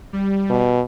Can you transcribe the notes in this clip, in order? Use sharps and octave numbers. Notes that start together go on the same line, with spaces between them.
G3
B2